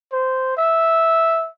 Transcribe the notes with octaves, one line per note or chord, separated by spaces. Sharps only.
C5
E5